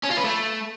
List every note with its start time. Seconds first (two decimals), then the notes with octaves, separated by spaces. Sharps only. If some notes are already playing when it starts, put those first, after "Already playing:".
0.04 C#4
0.10 F4
0.17 B4
0.24 A3